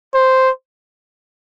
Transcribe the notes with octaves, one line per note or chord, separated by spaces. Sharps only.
C5